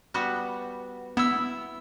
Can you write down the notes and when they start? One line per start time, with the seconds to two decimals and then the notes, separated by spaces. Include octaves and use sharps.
0.14 G3 B3 F#4
1.17 B3 E4 E6